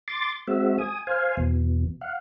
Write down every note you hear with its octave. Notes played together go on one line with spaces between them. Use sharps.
C6 D6 A6
G#3 C4 F#4 E5
G#5 D#6
C5 F5 G#5
E2 B2
F5 F#5